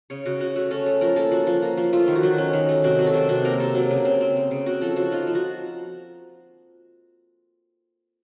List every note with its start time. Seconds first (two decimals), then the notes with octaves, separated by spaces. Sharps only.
0.10 C#3 C#5
0.25 C#3 F#4
0.40 C#4 F#4
0.55 A3 F#4
0.71 C#4 A4
0.86 A3 A4
1.01 F3 A#4
1.16 A#3 A4
1.32 F3 F#4
1.47 F3
1.62 A#3
1.77 F3
1.93 A3 F4
2.08 D#3
2.16 F#4
2.23 F#3
2.38 C#4
2.53 D#3
2.69 A3
2.84 C3 F#4
2.99 F#3
3.07 A4
3.14 C3
3.29 C3 F#4
3.45 A#3 A#4
3.60 C3 A4
3.75 F#3
3.91 C#3
4.05 C4
4.21 C4
4.36 C#3
4.51 C#3
4.66 C4 F#4
4.82 F3 A4
4.96 F3 F#4
5.12 D#4 F4
5.27 F3
5.35 F#4